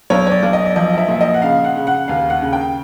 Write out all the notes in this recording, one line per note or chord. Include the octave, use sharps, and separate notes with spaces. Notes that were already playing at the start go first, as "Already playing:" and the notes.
B1 C#5
C#5
D5
B1
D#5
D5
F3 D#5
D#5
E5
A#2
D#5
F#5
C#3 F5
F#5
C#3
F#5
D#2 F5
F#5
C#3
G5